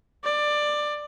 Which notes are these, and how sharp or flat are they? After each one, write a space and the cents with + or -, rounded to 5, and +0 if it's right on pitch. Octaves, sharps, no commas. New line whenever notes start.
D5 +15